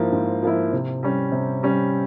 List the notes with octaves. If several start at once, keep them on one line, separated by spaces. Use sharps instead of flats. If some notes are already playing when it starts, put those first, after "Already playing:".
Already playing: G#2 F3 A#3 E4
G#2
F3 A#3 E4
C3
G3 C#4
C3
G3 C#4